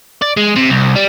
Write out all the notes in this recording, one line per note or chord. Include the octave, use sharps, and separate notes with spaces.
D5
G#3
C3
C2
G3